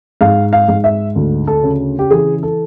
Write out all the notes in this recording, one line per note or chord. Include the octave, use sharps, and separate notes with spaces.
G#2 F5
F5
G#2
E5
D2
A4
C#3
G4
E3 G#4
A4